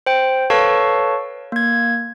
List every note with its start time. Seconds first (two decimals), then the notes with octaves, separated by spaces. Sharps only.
0.06 C5 G5
0.50 A4 B4 C#5 F5 A5 C#6
1.52 A#3 G#6